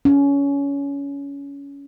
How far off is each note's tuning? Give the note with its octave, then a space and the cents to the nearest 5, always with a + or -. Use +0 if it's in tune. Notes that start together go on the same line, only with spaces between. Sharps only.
C#4 +20